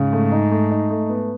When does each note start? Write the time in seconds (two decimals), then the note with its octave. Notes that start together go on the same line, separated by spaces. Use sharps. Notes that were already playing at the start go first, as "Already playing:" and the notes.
Already playing: G#2 C#3
0.13 A3
0.32 D#4
0.52 A3
0.71 D#4
0.90 A3
1.09 B3